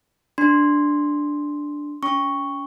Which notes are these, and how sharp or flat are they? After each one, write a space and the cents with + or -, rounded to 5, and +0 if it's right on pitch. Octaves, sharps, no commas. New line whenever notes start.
D4 +0 C6 +0
C#4 +35 C#6 +0